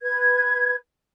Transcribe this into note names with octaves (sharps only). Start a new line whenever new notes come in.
B4 G#6